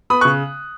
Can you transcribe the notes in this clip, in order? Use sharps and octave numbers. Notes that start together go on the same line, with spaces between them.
B3 B5 D#6
C#6 F#6
C#3